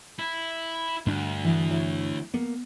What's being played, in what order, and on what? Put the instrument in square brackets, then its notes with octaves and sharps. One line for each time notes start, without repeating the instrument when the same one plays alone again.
[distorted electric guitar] E4
[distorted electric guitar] D2 [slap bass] G2 D4
[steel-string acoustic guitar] E3
E4 C#5
[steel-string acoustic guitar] A#3 [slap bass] B3